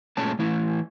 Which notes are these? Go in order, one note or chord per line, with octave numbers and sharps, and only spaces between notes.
A#2 G#3 A3 C#4 A5
E3 A3 E4